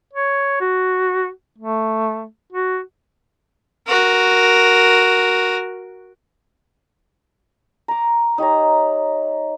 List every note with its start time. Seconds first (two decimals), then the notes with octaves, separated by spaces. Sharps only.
0.13 C#5
0.61 F#4
1.58 A3
2.53 F#4
3.87 F#4 A#4
7.88 A#5 D6
8.38 D#4 G4 C#5 A#5